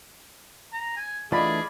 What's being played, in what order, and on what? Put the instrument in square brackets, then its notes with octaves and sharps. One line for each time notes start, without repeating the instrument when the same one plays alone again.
[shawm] A#5
G#5
[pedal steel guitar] E3 A3 D4 [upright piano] F4 D#5 [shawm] G#4 [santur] D5 B5